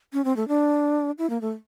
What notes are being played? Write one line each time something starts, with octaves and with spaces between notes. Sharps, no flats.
C#4
C4
A3
D4
E4
A#3
A3